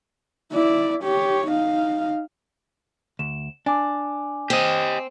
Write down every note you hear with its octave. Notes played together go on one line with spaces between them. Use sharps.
E4 D5
G4 C#5
D#4 F5
D2 E7
D4 G#5 D6
C4 G4 D#5